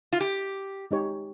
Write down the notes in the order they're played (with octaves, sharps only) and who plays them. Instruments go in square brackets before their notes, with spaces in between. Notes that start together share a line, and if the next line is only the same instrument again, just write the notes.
[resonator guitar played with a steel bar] F4
G4
[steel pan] G#3 D#4 G4 C#5